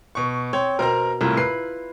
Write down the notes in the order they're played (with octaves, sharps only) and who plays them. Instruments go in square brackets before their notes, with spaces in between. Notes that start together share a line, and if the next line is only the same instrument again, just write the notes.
[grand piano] B2 C#6
[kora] C4 [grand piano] C#5
[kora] B2 [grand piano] A#4 C5 A#5
[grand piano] C2 A2 [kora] E4 F4 A#4
[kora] B4 [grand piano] C7